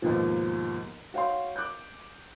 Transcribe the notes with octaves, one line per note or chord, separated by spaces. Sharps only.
D#2 G#2 B2 F3
F#4 C#5 F5 G5 C6
D6 F#6 G6